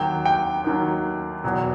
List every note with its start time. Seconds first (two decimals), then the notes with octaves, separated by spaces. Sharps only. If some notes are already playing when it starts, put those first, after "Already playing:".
Already playing: D#2 D#3 F#3 G5
0.25 G5
0.64 D#2 D#3 F#3
1.44 E2 B2 F#3